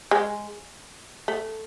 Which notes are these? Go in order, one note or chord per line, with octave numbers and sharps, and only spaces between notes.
G#3
A3